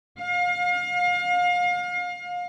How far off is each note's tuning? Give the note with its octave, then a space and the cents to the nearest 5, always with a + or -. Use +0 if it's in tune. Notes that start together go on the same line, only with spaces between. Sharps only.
F5 +35